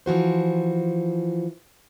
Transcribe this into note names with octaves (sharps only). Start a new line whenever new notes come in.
E3 F3 F#4 C5